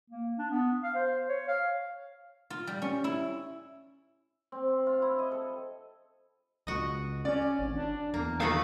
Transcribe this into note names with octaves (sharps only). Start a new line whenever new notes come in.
A#3
D4
B3
F5
C5
C#5
F5
F4
G3
C#4
E4
C4
C6
F4
E4
D#5
A4
C#2 F#4 D#5
C#4 D5
G#1
D4
E2 A#3
D#3 A3 F#4 B4 F5